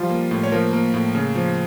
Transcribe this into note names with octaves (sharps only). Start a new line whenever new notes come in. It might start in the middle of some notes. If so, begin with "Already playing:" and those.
Already playing: F3 G3 F4
A#3
A2
C#5
F3 A#3 A#4
A#3
A2
C#3
F3